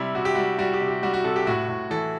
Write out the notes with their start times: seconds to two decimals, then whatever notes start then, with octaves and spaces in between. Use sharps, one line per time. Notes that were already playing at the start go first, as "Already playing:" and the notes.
Already playing: C3 G3 E4
0.15 C3 F#4
0.25 G4
0.35 G3 F#4
0.58 G3 F#4
0.73 G4
0.81 C3
0.88 G4
1.03 G3 F#4
1.13 F#4
1.24 C3 A4
1.36 G4
1.47 A2 F#4
1.68 A2
1.90 E3 A4